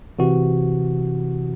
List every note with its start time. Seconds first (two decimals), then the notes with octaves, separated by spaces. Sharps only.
0.19 C3 E3 F#4